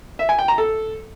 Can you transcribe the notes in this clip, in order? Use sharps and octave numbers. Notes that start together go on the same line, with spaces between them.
E5
G#5
G5
A#5
A4